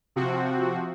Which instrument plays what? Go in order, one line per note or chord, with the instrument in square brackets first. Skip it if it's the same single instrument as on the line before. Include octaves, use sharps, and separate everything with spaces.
[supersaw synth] C3 F3 C4 F#4